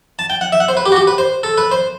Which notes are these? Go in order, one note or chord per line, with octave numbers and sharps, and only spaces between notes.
A5
G5
F#5
E5
F#5
C5
B4
G4
F#4
G4
B4
C5
A4
B4
C5